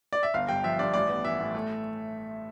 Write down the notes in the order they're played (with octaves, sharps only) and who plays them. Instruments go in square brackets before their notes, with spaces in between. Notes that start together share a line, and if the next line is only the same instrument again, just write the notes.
[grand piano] D5
E5
G1 F5
G2 G5
F3 E5
G2 D5
A1 D5
B3
E3 E5
A2
A3